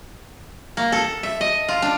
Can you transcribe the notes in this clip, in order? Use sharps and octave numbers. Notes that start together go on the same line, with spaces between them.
A#3
A4
E5
D#5
F4
D4